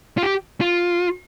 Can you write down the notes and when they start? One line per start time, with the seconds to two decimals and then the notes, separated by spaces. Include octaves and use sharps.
0.18 F4
0.23 G4
0.61 F4